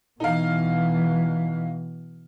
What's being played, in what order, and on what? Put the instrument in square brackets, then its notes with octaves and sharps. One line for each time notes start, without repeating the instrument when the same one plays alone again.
[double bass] B2 E3 [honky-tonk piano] D#4 F5